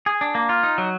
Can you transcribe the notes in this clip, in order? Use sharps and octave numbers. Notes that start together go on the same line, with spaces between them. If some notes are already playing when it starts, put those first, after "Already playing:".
G#4
D4
A#3
F4
D#4
F#3